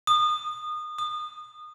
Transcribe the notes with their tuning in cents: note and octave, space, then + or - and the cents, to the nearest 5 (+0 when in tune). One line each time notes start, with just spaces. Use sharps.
D#6 -25
D#6 -25